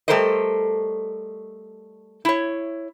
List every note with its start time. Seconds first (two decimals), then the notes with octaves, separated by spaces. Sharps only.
0.08 G3 A3 A4 A#4 C5 D#5
2.25 E4 C#5